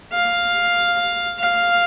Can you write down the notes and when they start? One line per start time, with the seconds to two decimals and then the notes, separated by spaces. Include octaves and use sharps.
0.13 F5
1.40 F5